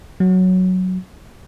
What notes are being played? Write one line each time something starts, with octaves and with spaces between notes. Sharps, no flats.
F#3